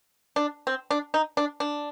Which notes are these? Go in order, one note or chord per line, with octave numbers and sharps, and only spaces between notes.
D4
C4
D4
D#4
D4
D4